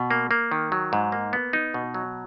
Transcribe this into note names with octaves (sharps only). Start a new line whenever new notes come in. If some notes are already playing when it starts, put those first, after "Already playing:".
Already playing: B2
A#3
A#3
D#3
F#3
G#2
A#3
B3
D#4
B2
F#3